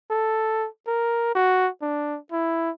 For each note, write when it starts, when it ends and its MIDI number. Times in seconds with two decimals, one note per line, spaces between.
0.11 0.68 69
0.87 1.33 70
1.35 1.69 66
1.82 2.18 62
2.32 2.70 64